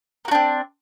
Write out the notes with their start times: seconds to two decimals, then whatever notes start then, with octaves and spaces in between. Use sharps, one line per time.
0.25 A#3
0.28 F#4
0.31 D4
0.35 C4